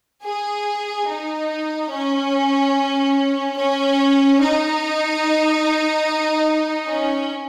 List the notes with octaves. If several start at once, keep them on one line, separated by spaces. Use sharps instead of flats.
G#4
D#4
C#4
C#4
D#4
C#4